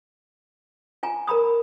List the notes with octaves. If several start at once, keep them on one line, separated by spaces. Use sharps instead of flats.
F4 G#5 A#5
A#4 A#5 B5 D#6